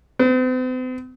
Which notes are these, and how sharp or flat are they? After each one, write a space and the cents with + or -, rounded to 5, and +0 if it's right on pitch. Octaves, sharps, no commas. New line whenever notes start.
C4 -45